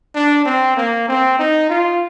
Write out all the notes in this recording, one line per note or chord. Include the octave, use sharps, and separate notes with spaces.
D4
C4
A#3
C4
D#4
F4